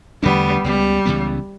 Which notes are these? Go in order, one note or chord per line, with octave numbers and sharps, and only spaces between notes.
E2 D3 G3 A3 B3 D4
C#2 C#3 E3 G3 B3
C#2 C#3 E3 B3